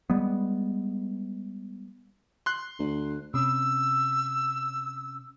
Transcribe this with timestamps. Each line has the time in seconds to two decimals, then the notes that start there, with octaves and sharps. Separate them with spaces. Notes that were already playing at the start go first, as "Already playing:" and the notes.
0.10 G3 G#3 B3
2.46 C6 F#6
2.79 D2
3.34 C3 C#4 D#6 E6